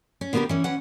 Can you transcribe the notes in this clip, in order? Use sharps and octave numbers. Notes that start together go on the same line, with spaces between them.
C#4
D3 A#3 B3 F#4 G4 A#4
E3 C#4
E3 C#4 F#5